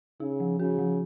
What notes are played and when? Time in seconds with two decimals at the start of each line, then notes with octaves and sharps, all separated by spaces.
0.20 C#3 D#4
0.40 F3
0.59 C#3 F#4
0.79 F3